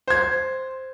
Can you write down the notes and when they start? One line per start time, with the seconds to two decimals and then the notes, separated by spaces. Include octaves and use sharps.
0.08 C5 G#6